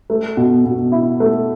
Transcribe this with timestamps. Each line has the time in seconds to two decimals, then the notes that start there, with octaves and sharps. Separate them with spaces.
0.10 A3
0.37 B2
0.65 B2
0.92 E4
1.20 A3